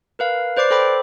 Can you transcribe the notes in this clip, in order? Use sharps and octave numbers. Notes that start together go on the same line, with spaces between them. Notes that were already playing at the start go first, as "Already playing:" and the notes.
A#4 B4 F5
B4 C5 D5 D6 C7
A4 C5 G5 B5 D6